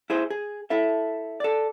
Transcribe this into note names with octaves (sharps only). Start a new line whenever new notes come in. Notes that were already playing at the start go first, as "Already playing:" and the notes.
E4 G#4 C5
G#4
E4 A4 E5
A4 D5